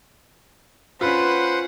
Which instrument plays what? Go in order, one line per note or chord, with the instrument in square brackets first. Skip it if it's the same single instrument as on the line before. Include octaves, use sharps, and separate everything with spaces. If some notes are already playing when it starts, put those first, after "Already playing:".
[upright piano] C#4 F4 [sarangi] B4 [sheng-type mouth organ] C5 F#5